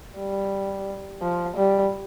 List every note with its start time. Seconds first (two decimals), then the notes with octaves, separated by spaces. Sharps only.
0.18 G3
1.22 F3
1.57 G3